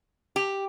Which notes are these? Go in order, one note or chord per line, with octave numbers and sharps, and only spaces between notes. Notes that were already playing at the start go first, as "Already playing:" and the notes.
G4